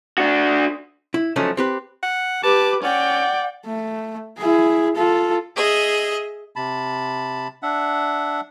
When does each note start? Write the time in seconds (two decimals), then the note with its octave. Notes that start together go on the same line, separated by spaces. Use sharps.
0.18 D4 F#4
1.14 E4
1.36 F3 F#3 A3 C#4 D#4
1.57 C4 G4 B4
2.03 F#5
2.44 G4 B4 A5 D6
2.83 C#4 D5 F#5 G5
3.66 A3
4.37 E4 G#4
4.95 F4 A4
5.56 G#4 D#5 E5
6.56 C3 A5 B5
7.63 D4 E5 F#5